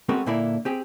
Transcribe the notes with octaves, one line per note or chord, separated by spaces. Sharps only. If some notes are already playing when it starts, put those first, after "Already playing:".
G#3 B3 C4 F#4 A4 A#4
A#2 D3 A#3 E4 A4 D5
C4 G4 G#4